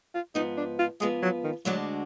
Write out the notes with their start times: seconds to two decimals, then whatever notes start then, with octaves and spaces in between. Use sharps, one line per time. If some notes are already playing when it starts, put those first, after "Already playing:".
0.14 F4
0.35 G#2 F3 B3 D#4
0.57 D4
0.79 F4
1.00 G#2 F3 G#3 B3
1.22 F#3
1.44 D#3
1.65 D2 D3 F#3 G#3 D4 F#4